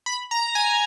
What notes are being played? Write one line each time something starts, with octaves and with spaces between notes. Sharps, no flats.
B5
A#5
G#5